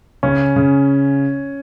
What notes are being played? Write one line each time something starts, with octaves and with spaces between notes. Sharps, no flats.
C#3 C#4
C#3